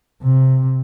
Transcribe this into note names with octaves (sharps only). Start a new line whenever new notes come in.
C3